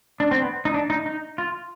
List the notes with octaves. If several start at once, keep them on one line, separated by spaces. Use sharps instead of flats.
D4
C4
B3
D#4
D4
D#4
D#4
F4